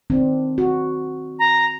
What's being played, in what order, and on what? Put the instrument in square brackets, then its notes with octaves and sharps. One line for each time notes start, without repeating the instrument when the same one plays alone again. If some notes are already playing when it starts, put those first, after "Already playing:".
[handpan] D#3 C4 D4
F#4
[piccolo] A#5